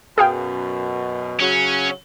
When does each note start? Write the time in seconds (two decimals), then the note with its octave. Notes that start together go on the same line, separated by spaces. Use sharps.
0.18 F#2 B2 G#4 F5 G5
1.40 C#3 F#3 C#4